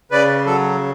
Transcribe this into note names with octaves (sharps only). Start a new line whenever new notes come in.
C#3 B4 D5
F#3 A4